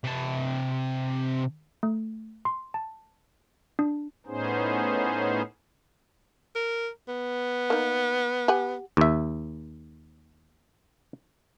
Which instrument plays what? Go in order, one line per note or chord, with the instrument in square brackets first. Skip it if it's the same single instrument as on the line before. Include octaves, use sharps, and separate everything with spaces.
[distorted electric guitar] C3 A5
[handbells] A3
C6
A5
D4
[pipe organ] A2 B3 C#4 D#4 G#4 C5
[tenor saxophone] A#4
B3
[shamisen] A#3 D#4
G4 F#5 G#5
[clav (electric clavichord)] D#2 E5